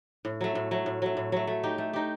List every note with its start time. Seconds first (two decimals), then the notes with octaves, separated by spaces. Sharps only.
0.25 A2
0.41 F#3 A3
0.55 A2
0.71 F#3 A3
0.86 A2
1.02 F#3 A3
1.17 A2
1.32 F#3 A3
1.47 A3
1.63 D#4 G4
1.78 A3
1.93 D#4 G4